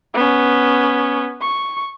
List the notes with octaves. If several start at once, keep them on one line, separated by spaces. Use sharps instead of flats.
B3 C#4
C#6